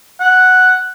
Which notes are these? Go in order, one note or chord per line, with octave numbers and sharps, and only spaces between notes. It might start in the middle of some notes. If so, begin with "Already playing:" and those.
F#5